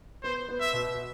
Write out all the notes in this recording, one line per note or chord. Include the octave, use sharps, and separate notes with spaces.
B3 C5
B3
E5
B2